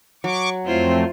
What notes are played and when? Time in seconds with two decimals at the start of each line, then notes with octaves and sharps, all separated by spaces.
0.24 F#3 C#6 D6
0.66 F2 A3 C4 E4 F4 C5